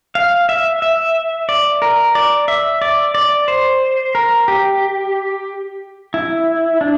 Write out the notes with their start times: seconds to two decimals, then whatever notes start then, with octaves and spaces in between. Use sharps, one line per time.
0.15 F5
0.49 E5
0.82 E5
1.49 D5
1.82 A#4
2.15 D5
2.48 E5
2.82 D5
3.15 D5
3.48 C5
4.15 A#4
4.48 G4
6.14 E4
6.81 D4